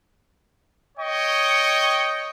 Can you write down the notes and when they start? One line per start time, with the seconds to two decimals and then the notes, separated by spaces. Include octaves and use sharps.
0.98 C#5 D#5 G5 C#6